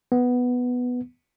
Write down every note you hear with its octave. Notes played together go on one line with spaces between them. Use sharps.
B3